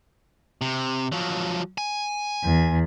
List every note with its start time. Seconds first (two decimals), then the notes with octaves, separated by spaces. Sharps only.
0.61 C3
1.12 F3 F#3
1.78 G#5
2.44 E2